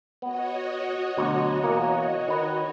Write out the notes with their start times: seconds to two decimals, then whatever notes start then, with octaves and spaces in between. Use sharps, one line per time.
0.22 B3 F#4 C#5 D#5
1.17 D2 B2 F#3
1.64 B2 E3 A#3
2.28 D#3 B4